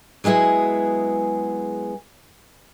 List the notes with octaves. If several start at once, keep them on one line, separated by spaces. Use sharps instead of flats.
F#3 G#3 B3 E4 G#4